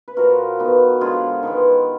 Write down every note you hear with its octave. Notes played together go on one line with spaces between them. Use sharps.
B4
A#2 F3 A#3 F#4 A#4
D#3 F#3 B3
D3 F3 G#3 F4 G#4
D#3 G#3 B3